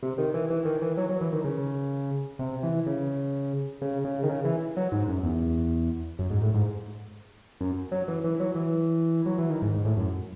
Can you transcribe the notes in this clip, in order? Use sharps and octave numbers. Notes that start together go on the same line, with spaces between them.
C3
D#3
E3
E3
D#3
E3
F#3
F#3
E3
D#3
C#3
C3
E3
C#3
C#3
C#3
D#3
C#3
E3
F#3
G#2
F#2
E2
F#2
G#2
A2
G#2
F#2
F#3
E3
E3
F#3
E3
F#3
E3
D#3
G#2
G#2
A2
F#2